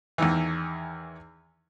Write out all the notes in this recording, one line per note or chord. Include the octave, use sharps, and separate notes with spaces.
E2 D#3 E3